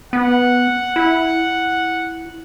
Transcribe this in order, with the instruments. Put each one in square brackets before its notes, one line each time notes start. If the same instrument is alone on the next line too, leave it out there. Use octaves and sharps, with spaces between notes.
[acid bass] B3 [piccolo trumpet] F#5
[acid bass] E4